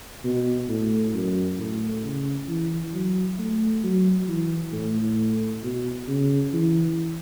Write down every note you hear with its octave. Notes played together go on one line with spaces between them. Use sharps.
B2
A2
F#2
A2
C#3
E3
F#3
A3
F#3
E3
A2
B2
C#3
E3